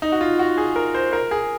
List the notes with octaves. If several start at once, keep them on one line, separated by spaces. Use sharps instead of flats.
D#4
F#4
F4
F#4
G#4
A#4
C5
A#4
G#4